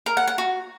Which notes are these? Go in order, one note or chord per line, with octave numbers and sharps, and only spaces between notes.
A#4
F#5
F#5
F#4